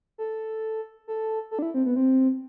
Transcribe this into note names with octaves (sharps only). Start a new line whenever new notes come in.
A4
A4
A4
D4
E4
C4
B3
C4